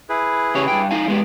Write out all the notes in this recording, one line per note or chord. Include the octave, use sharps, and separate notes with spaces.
E4 G#4 B4
C#3 G4 C#5
G2 G5
D#4 F5 G#5
G#3 B3 G4